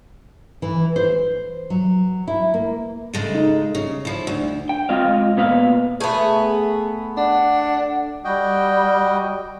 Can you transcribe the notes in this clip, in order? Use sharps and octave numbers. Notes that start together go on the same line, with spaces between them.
E3
C5
F#3
E4
A#3
C#3 G#3 A3
D#4
C#3
F3 E4
D2
G5
G#3 C4 F4 D#5 F5
A#2 B3 B4 F5
A3 B3 G#4 A4
D4 F#5
G3 F#4 D#5 G5